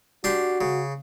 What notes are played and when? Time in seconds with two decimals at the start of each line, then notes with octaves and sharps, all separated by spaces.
0.24 D4 F#4 G4 C6
0.61 C#3